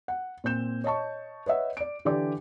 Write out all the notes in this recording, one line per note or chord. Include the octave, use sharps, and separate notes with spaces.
F#5
A#2 C4 G6 E7
C#5 D#5 A5 C#6
B4 C#5 D#5 E5 F#5
D5 D7
D3 E3 G4 D5 D6